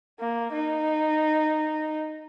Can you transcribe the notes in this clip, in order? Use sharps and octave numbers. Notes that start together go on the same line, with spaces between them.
A#3
D#4